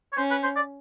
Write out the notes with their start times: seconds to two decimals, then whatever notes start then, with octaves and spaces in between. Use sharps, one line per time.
0.13 C#5
0.17 C#4 C5
0.31 B4
0.43 C5
0.56 D5